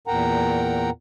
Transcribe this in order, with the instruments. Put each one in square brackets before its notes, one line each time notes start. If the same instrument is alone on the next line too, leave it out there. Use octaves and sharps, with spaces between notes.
[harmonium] E2 A#2 A#4 F#5 G5 A#5